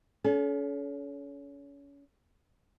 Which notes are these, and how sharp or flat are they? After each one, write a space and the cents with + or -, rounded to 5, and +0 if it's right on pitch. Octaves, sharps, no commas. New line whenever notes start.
C#4 +30 A4 -35